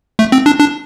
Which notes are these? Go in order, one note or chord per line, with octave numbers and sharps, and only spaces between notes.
A3
C4
D4
D4